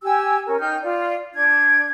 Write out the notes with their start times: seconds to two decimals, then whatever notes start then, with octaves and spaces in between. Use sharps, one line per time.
0.03 G4 G#5 E6
0.47 C#4 A#4
0.60 D#4 G5 F6 G6
0.83 F4 D5
1.34 D4 G#6